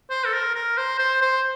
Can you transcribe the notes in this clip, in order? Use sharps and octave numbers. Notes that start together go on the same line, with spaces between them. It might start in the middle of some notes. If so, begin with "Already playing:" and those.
C5
A4
A#4
A#4
C5
C5
C5